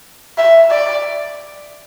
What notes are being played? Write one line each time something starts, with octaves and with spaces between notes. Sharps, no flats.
E5
D5